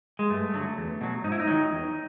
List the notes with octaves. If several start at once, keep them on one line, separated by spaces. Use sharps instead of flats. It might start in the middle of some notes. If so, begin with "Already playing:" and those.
G#3
G2 A3
D3 F#3
E2
B2 F#3
G#2 D#4
E4
D#4
D#3 F#3
E2